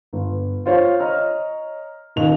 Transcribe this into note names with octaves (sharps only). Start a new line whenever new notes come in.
G1
F4 C5 C#5 F5
C#5 D#5 A#5 F6
D#1 D#2 D#5 F7